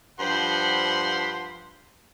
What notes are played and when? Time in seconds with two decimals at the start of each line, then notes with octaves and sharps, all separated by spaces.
0.20 G2 F3 C5 F#5 B5 C6